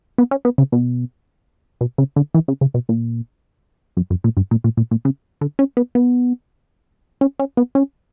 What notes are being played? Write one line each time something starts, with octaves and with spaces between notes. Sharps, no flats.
B3
C#4
B3
C#3
B2
B2
C#3
D3
E3
C#3
C#3
B2
A#2
F#2
F#2
A#2
G2
A#2
A#2
A#2
A#2
C#3
D3
C#4
B3
B3
C#4
C#4
B3
C#4